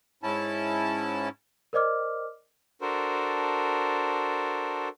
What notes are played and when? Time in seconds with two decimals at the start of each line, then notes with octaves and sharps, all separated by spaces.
0.23 G#2 C#4 E4 A5
1.73 A#4 C5 D5 D#5 D6 F6
2.81 D4 F#4 A4 A#4 C5